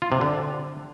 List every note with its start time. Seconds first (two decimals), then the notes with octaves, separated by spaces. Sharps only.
0.02 F4
0.12 C3
0.21 D3